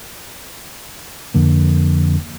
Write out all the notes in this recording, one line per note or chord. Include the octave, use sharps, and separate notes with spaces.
F2 D3 A#3